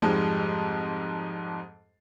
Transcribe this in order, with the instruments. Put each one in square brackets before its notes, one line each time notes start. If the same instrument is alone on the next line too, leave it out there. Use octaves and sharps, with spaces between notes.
[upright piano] F2 G#2 F3 G3 G#3